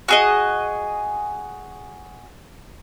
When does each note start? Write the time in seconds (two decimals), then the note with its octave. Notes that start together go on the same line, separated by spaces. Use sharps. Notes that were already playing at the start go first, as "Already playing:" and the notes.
0.08 F#4 G#4 D#5